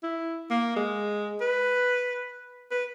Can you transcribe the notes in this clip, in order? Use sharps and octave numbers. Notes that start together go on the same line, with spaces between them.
E4
A#3
G#3
B4
B4